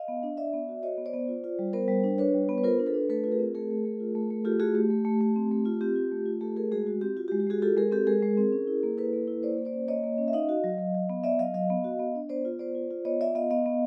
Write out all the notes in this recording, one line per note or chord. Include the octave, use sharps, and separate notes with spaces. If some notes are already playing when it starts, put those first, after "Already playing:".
Already playing: D#5 F5
B3
D4
D4 D5 E5
B3
F#4
F#4 C#5 D#5
B3
C5 D5
B3
F4
F4
G3
B3 A#4 C5
G3
D4
D4 B4 C#5
G3
B3
B4
F4 A#4 C5
D4
A4 B4
D4
A3 A4 B4
F4 B4
G#4 A#4
C4
A3 G#4 A#4
A3
A3
F4
A3
A3
F4 G4 A4
A3 F#4 G#4
A3 G4
A3
A3
A3
C4
A3
F4
C4 G4
F4
A3
F4
A3 G4 A4
A3 G#4 A#4
G#3 F#4 G#4
G#3 F#4
C4 G4
F4 F#4
G4
G#3
G4
G#3 F#4 G#4
F4 G4 A4
G#3 G#4 A#4
C4 G4 A4
G#3 G#4 A#4
G#3
C4
C#4
E4
A#3
E4 A4 B4
A#3
E4
A#3 C5 D5
A#3
C5 D5
C#4
A#3 C#5 D#5
A#3
C#4
E5
D#4 D#5 F5
F#4
F#3
F#3
F#3
B3
B3 D5 E5
F#3 D#5 F5
F#3 D#5 F5
B3
F#4
B3
D4
B3 C5 D5
F4
B3 C5 D5
F4
F4
B3 C#5 D#5
F4 D5 E5
B3 D#5 F5
B3 D#5 F5
B3